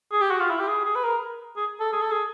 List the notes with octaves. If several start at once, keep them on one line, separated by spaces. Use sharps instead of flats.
G#4
G4
F#4
F4
E4
G4
G#4
G#4
B4
A#4
G#4
A4
G#4
A4
G#4